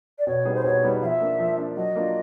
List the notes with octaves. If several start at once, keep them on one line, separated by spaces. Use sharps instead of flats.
D5
B2 C#5
G3 B3 D#4 G#4
C5
B2 C#5
G3 B3 D#4 G#4
F3 E5 F5
A#3 D4
F3
A#3 D4
F#3 D#5
A#3 D4 F4 A#4